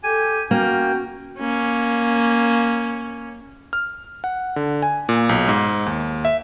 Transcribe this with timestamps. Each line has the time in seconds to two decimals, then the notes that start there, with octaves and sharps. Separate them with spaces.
0.04 G4 A4 G#5
0.51 A#3 C#4 F#4 G5
1.39 A#3 C#4
3.73 F6
4.24 F#5
4.56 D3
4.82 G#5
5.09 A#2
5.29 B1
5.48 G#2
5.86 D#2
6.25 E5